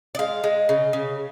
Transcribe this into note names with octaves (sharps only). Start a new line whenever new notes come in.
D5
G#3 F5
G#3
C#3
C#3